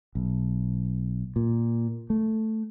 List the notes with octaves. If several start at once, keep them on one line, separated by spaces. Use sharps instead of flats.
B1
A#2
A3